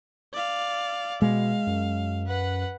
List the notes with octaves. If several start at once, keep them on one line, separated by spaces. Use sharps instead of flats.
D5 F5
B2 G#3 F5
F#2
B4 F#5